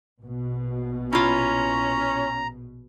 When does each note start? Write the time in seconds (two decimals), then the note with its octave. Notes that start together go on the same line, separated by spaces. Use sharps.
0.20 A#1 B2
1.13 C#4 E4 F4 A#5